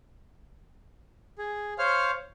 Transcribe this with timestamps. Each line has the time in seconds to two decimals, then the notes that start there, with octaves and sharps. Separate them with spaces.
1.38 G#4
1.78 C5 C#5 F5 F6